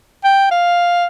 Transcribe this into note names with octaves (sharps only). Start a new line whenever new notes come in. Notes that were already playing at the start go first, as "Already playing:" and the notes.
G5
F5